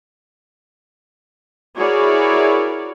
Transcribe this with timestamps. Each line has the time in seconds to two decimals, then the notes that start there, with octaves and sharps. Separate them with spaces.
1.77 E4 F#4 G#4 A#4 C#5 D5